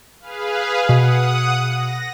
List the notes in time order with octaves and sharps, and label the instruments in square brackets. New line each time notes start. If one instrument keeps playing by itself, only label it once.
[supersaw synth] G#4 B4 F5
[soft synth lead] B2 [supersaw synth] F#5 D#6
[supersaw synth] A#6